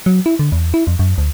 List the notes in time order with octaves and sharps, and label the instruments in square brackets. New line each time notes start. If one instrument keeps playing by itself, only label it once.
[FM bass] F#3
E4
D3
E2
E4
F2
F#2
D2